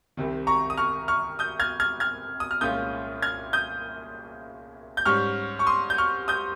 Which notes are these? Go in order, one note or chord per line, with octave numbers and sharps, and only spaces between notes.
C2 C3 D#3
A#5 C#6
D#6
C#6 F6
C#6 F6
D#6 G6
F6 G#6
F6 G#6
F6 G#6
D#6
F6
C2 A#2 G#3 C#4 F4 D#6 G6
F6 G#6
D#6 G6
G6
G#2 G3 C#4 C#6 F6
C#6
C6 D#6
G6
C#6 F6
D#6 G6